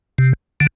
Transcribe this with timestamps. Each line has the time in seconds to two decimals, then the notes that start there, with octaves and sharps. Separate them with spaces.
0.18 C3
0.60 D3